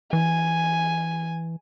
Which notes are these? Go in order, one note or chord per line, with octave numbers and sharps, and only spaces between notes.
E3 G#5